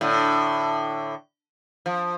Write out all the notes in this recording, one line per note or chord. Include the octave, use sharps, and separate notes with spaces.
A2 D3
F3